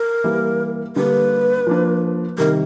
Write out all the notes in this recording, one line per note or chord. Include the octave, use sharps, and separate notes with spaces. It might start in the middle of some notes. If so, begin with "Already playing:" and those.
Already playing: A#4
E3 G3 A#3
D3 G3 A#3 B4
F3 A#3 D4
C3 D#3 G3 A#4